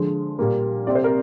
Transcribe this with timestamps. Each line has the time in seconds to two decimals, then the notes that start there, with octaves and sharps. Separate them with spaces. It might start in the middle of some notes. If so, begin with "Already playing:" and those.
Already playing: D3 F3 G#3
0.39 A#2 G3 A#3
0.87 C3 G3 C4 D5
0.95 C5
1.04 A#4